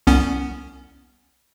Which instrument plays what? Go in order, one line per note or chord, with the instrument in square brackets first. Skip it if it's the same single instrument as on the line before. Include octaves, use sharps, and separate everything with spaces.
[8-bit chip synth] C2 B3 C#4